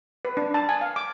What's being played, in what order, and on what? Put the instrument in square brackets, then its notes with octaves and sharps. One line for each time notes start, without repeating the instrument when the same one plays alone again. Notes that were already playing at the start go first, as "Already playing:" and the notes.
[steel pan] B4
D4
A5
G#5
F5
D6